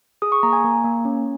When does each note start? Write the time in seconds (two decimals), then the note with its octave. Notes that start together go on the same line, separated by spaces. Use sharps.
0.22 G#4 D#6
0.32 C#6
0.43 A#3 A#5
0.53 G#5
0.64 A#3
0.84 A#3
1.05 C#4